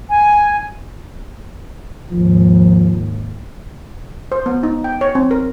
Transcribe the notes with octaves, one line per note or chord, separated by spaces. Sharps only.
G#5
D#2 G#2 F3
C5
B3
D#4
G5
C#5
C4
A#4